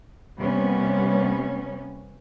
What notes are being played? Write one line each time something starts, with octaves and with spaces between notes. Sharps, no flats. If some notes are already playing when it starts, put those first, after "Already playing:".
C3 G3 A#3 B3 C#4